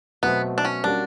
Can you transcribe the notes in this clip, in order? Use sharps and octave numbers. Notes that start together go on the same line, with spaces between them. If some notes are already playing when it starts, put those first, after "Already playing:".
B2 F#3 A3 B3 C4
D4
C#4
G3 A#3 C#4 D4 F#4